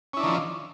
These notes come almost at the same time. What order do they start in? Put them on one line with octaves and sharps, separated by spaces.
C#4 E4 D4 D#3 F3